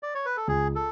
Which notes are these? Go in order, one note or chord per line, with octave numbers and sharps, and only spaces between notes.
D5
C#5
B4
A4
C#2 G#4
A4